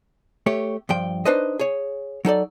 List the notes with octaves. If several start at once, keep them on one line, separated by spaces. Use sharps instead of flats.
A3 G4 C#5
G2 F3 G5
D4 D#4 B4 C5 D#5
G#4 C#5
F#3 D#4 A4 D5